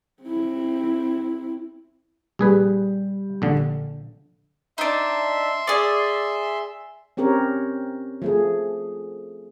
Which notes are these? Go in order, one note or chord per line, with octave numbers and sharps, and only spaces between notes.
C4 E4
A#1 G3 G4 G#4 B4
A#1 D3
D4 D#4 E5 C6
G#4 D5
C4 C#4 G4 A#4 C#5
F3 A3 G#4